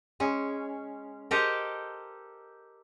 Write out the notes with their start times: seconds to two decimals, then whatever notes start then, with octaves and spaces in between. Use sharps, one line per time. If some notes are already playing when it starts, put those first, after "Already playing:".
0.20 G#3 C#4
1.31 G4 A4 A#4 C5 D#5 G5